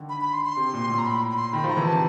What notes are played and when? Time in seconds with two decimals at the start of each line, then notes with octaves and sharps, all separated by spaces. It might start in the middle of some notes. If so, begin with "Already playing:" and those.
Already playing: D3 D#3
0.09 B5
0.21 B5
0.33 C6
0.45 C6
0.56 C3
0.74 A#2
0.89 A2
0.98 A#5
1.05 B5
1.31 B5
1.37 C6
1.53 D#3 B5
1.64 F3 A#5
1.77 E3
1.84 C3 A5